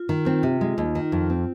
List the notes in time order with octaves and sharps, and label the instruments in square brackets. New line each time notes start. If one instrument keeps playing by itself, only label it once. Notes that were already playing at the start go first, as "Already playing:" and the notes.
Already playing: [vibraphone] F4
[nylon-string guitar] D#3
[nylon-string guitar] C4 [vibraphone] F4
[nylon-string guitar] C3
G#3
D#2
D#3
F2
C4